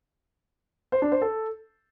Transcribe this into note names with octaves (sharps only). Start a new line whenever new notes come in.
C5
D4
C5
A4